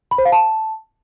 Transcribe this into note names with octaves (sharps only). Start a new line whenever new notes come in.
B5
C5
F5
A5